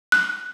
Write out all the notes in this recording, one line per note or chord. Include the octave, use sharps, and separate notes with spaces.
F#6